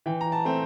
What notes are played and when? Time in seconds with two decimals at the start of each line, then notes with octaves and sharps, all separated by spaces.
0.06 E3 G5
0.21 A#5
0.32 A5
0.45 A3 C4